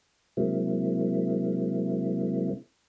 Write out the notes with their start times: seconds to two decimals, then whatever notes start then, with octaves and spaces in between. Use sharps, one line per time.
0.37 C3 F#3 G#3 A#3 C4 E4